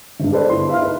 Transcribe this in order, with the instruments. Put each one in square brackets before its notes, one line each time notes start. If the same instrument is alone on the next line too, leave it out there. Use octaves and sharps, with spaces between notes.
[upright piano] G#1 G2
G4 A4 B4 C5 D5
G1 E4 C6
E5 F5 C6 F6
D#4 B4